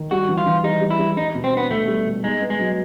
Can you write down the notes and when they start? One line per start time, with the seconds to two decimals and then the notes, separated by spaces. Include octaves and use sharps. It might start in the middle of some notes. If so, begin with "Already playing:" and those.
Already playing: D#3
0.11 G3 F#4
0.29 E3
0.37 F4
0.46 E3
0.64 G3 D#4
0.81 G3
0.90 E4
0.99 G3
1.17 G3 D#4
1.35 B2
1.44 C4
1.53 B3 D4
1.70 B2 A3
1.88 G3
2.06 B2
2.23 G#3 D#4
2.41 B3
2.50 G#3
2.60 F#3